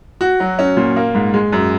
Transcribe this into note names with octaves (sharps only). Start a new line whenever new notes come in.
F#4
F#3
C#4
A#2
A#3
G#2
G#3
F#2